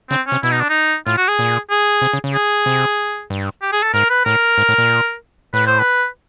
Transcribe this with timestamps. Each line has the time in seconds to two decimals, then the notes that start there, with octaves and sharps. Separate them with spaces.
0.10 C#3 C4
0.27 C3 C#4
0.43 B2 E4
0.51 D#4
0.60 D4
0.70 D#4
1.07 A2 F4
1.17 F#4
1.28 G#4
1.39 A#2
1.70 G#4
2.02 C3
2.13 C#3
2.24 C#3
2.34 G#4
2.66 C3
3.30 G2
3.62 G4
3.73 G#4
3.83 A4
3.94 G#2 A#4
4.10 B4
4.25 A2 A#4
4.58 G#2
4.69 A2
4.78 A#2
5.53 A2 B4
5.67 C5
5.79 B4